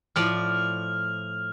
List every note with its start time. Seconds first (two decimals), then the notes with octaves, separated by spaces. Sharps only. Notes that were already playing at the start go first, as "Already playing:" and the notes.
0.16 A2 F3 D5 F6 F7